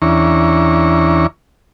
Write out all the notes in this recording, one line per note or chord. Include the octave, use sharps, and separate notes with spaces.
E2 E3 C#4 D4 A#5 C#6